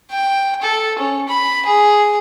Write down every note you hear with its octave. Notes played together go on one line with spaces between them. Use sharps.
G5
A4
C#4
B5
G#4